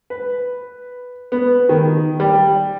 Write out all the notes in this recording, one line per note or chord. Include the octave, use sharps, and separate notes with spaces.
B4
B3
D#3
G3